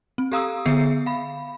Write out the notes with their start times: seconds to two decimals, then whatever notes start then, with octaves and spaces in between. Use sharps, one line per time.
0.18 C4
0.32 G4 A4 F5 A#5 D#6 E6
0.65 D3 B3 G#4 E5 C7
1.06 F5 B5